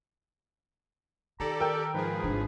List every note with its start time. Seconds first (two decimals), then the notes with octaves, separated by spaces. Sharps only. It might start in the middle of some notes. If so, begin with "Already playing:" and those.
1.40 D#3 G4 A4 D5 A#5
1.60 A#4 G5 E6
1.94 G#2 F3 G#4 B4
2.24 G#1 D3